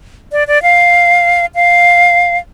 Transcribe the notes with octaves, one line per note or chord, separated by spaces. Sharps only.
D5
D5
F5
F5